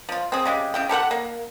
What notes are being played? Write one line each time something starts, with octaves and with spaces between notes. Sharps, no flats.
F3 F4
C4 G#4
C#3 G#3 G4
C#3 E4 G5
G4 A4 A#4 F#5
A#3